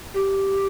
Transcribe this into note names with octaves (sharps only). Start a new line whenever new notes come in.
G4